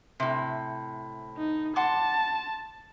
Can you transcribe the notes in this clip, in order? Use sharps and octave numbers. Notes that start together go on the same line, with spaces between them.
A2 C3
D#4
F#5 A5 C6 D6